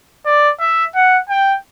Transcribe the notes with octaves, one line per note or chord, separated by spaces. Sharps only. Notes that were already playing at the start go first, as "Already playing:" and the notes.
D5
E5
F#5
G5